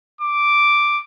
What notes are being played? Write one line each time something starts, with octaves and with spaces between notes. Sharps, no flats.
D6